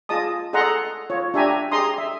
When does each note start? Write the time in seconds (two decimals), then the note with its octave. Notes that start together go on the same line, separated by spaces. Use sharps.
0.09 F4 G#4 D#5 A5 D#6
0.53 G#4 A4 D#5 F#5 A#5 C6
1.10 F4 C#5
1.34 D4 G4 E5 G#5 A#5
1.72 G4 G#4 D#5 A#5 C6 D#6
1.98 E5